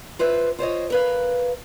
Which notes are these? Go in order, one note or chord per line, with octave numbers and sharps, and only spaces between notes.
F4 B4 C5 E5
F4 C5 C#5 D#5
A#4 B4 F5